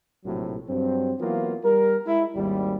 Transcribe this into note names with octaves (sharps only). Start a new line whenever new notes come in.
A#1 A2 C3 F#3
G2 F#3 C4
E3 F#3 A#3 B3 F4
G3 A#4
G#3 E4
G#1 D#2 G3